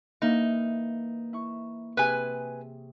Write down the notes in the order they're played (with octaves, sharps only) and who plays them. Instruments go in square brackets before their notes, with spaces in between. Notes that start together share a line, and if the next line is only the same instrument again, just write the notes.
[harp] E3 A#3 E5 [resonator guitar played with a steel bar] D#4
[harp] E4 C#6
[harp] C3 G#4 E6 [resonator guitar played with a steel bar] B4 G#5